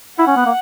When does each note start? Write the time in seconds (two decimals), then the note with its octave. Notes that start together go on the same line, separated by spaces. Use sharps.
0.18 E4 F#5
0.27 C#4
0.36 B3
0.45 A#3